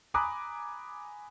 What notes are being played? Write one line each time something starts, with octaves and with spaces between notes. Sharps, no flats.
G#5 A#5 B5 D6 D#6 F#6